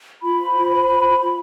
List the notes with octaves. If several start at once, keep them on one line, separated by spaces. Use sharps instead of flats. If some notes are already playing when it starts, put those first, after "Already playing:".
F4 B5
C5
F4
C5
C5
F4
F4